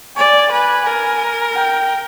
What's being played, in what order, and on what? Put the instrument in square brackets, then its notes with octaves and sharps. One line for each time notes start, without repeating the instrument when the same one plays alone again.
[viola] D5 [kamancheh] G#5
[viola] B4 [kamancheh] G#5
[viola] A#4 [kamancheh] G#5
[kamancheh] G5